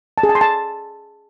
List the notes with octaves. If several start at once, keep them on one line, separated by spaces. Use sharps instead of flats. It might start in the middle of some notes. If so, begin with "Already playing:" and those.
A5
G#4
A5
C6
A5